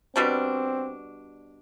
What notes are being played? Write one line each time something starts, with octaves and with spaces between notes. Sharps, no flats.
B2 G3 C4 D4